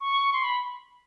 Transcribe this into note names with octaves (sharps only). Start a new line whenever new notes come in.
C#6
C6
B5